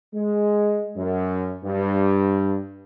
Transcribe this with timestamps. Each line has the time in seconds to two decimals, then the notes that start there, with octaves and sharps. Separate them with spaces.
0.15 G#3
0.96 F#2
1.65 G2